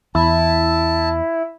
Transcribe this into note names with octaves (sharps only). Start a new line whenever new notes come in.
E2 E4 A5